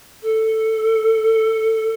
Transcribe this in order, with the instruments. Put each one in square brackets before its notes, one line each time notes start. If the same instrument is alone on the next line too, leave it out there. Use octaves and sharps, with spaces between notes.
[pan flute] A4